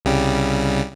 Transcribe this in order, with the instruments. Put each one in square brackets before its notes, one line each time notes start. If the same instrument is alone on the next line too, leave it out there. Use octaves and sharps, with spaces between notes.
[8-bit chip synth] C2 C#3 G3